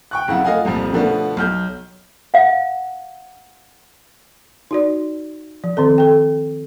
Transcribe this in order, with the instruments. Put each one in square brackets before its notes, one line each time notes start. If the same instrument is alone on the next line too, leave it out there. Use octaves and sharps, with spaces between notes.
[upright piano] G5 C#6 F#6
F#1 F2 E4 F5 F#5
A3 F4 D#5 F5 F#5 G#5
C2 F2 A#2 F3
B2 D3 F3 A3 B3 D4
B1 F6 G6
[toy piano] F5 F#5
[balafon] D#4 F#4 D5
F3
D#3 C4 A4
A4 G5